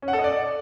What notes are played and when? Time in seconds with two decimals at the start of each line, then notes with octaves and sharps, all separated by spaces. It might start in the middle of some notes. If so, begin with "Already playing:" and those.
0.02 C#4
0.08 F#5
0.13 A4
0.19 D#5
0.24 D5